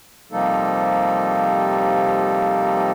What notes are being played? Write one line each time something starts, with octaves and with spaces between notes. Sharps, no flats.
C3 F3 G3 A#3 D#4 A4